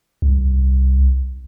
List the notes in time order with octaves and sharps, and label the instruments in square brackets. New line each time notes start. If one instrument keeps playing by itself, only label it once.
[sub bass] C2